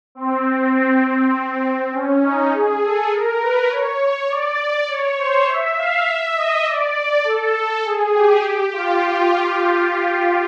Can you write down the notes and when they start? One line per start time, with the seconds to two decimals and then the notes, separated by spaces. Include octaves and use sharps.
0.15 C4
0.44 C4
0.74 C4
1.04 C4
1.92 C#4
2.23 D#4
2.52 G#4
2.81 A4
3.11 A#4
3.41 B4
3.70 C#5
4.29 D5
4.89 C#5
5.18 C5
5.48 E5
5.77 F5
6.07 E5
6.36 D#5
6.66 D5
6.96 D5
7.24 A4
7.85 G#4
8.14 G4
8.43 G4
8.73 F4